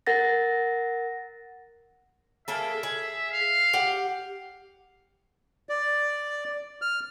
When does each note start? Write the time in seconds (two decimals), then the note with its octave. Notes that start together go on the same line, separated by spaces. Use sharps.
0.07 A#4 F#5 A6 A#6
2.48 A#3 G#4 A4 E5
2.83 G#4
3.32 F5
3.73 G4 F#5
5.69 D5
6.82 F6